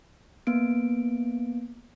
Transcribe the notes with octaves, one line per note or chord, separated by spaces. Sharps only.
A#3 B3 D7